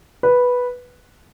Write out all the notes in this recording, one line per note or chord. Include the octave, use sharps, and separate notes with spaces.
B4